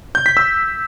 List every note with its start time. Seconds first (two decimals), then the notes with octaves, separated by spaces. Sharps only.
0.15 G6
0.26 B6
0.37 E6